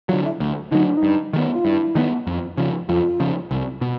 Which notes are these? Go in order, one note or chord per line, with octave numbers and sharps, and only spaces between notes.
D3 F#3 F4
E4
D2
D3 F#3 D#4
D4
D#4
G2
D#3 G#3 B3
F4
G2 E4
D#3 G#3 B3
F2
C#3 F3
F2 F4
C#3 F3
C2
B2